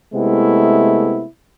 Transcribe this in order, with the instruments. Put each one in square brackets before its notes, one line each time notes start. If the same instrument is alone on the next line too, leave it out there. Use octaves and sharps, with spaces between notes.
[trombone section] C3 G#3 A3 B3 E4